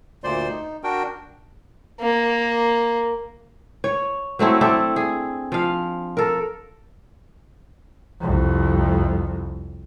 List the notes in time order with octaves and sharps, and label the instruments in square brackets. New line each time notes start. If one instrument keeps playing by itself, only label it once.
[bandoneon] D2 A#2 C5 D5 C6
D#4
D4 F#4 A#4 G5
[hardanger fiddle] A#3
[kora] C#5
F#3 A3 C4 E4
C4 D4 E4 A4
G#4
F3 F5
A4 A#4
[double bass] C2 F2